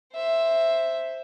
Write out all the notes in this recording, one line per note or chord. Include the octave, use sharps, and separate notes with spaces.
C5 E5